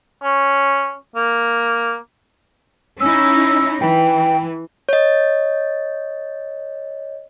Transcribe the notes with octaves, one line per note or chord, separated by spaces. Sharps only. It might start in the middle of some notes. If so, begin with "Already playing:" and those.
C#4
A#3
C#4 D#4 E4 E6
E3 G5
C#5 D#5